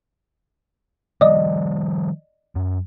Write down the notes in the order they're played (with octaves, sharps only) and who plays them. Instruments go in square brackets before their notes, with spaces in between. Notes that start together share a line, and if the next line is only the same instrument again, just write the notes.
[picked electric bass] D#3 F3 G3 [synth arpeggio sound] D5 D#5
[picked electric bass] F#2